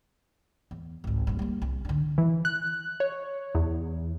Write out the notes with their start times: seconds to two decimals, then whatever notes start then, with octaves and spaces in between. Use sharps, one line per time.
0.71 E2
1.04 G#1 C#2
1.27 G2 A#2
1.39 G3 A#3
1.62 C2
1.85 D3 D4
2.18 E3
2.45 F#6
3.00 C#5
3.55 E2